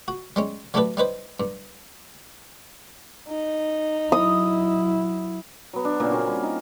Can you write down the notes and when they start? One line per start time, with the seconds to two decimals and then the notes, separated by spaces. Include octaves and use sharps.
0.08 F#4
0.36 G3 G#3 C#4
0.74 F#3 A3 D4 G4 A4 B4
0.97 G3 D#4 B4 C5
1.40 G2
3.29 D#4
4.12 F#3 E4 D#6
5.73 F#3 B3
5.85 D4
6.00 A#2 C#3 A#3
6.11 C4 C#4 F4 F#4
6.27 G3
6.43 D#4